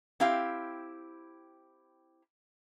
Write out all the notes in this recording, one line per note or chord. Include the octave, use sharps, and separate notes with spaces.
C4 E4 G4 F5